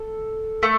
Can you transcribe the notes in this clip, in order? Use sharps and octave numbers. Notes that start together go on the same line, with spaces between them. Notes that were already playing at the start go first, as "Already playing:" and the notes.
Already playing: A4
A3